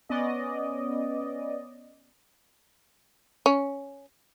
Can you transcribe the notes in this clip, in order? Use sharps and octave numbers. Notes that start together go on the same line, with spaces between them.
B3 C#4 D5 D#5
C#4